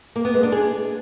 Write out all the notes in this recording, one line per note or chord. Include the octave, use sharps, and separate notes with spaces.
A#3
B3
G#3
D4
G#4